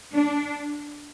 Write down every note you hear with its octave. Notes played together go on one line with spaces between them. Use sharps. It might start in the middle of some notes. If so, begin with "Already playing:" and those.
D4